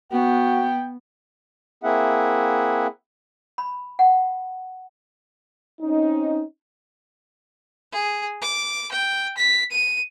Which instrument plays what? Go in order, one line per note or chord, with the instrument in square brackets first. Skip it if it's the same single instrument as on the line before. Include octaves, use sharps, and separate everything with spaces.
[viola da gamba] B3 [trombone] F#4 [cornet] G5
[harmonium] A#3 C4 E4 G#4 E5 F#5
[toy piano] B5
F#5
[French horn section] C4 C#4 D#4
[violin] G#4
D6
G5
B6
D#7